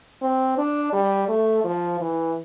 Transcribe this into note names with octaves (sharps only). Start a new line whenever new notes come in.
C4
D4
G3
A3
F3
E3